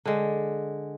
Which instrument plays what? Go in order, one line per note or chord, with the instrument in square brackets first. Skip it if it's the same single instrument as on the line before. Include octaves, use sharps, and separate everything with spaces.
[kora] D3 G#3